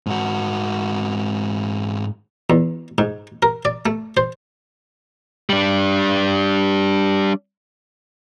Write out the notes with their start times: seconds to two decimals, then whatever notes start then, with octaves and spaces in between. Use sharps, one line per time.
0.06 G#2 F#4
2.50 E2
2.98 G#2
3.43 A#4
3.65 D5
3.86 A3
4.17 C5
5.50 G3 D4